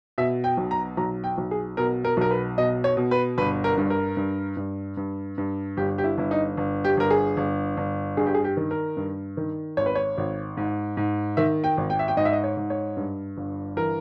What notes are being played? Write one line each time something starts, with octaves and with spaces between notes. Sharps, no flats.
B2 E5
G5
B1
A#5
B1 A#5
G5
B1
G#4
B2 A#4
A#4
B1 A#4
B4
B2 D#5
C#5
B2
B4
G1 B4
A#4
G2
A#4
G2
G2
G2
G2
G1 G4
G4
E4
G1 E4
D#4
G1
G4
G1 A#4
G#4
G1
G1
G2 G#4
G4
G#4
G4
D#3
A#4
G2
D#3
G#1 C#5
B4
C#5
G#1
G#2
G#2
D#3 E5
G5
G#1
G5
E5
G5
G#2 D#5
E5
D#5
C#5
G#2
C#5
G2
G1
E3 A#4